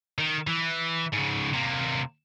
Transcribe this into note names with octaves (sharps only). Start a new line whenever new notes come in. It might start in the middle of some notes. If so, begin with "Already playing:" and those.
D#3
E3
G#2 C#3
C3 A#3